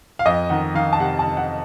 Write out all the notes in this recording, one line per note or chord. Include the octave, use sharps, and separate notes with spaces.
F5
F2 D#5
D#3 F#5
D#3 F5
A5
C3 F#5
A5
D#3
F#5